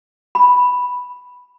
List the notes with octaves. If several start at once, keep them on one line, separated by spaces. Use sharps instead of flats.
B5